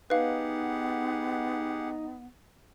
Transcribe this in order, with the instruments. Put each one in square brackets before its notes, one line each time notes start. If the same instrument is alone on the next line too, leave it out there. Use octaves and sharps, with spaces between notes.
[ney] B3 [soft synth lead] D#4 [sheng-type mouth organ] G4 G#4 F#5 [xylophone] B4 F5